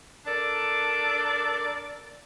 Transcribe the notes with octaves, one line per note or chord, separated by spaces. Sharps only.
D4 A4 A#4 D5